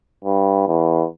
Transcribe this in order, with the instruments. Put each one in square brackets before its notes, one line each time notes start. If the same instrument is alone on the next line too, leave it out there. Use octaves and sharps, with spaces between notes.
[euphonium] G2
E2